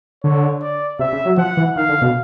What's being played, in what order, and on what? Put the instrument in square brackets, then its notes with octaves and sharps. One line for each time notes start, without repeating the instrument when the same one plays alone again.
[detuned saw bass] D3 [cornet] C#5
[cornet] D5
[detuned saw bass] C3 [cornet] E5
[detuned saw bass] C#3
F#3
[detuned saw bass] F3 [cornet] F#5
[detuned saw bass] E3
[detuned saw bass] D#3 [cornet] F5
[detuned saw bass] D3
B2